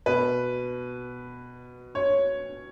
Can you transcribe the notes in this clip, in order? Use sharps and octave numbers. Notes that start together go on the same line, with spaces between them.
B2 B4
C#5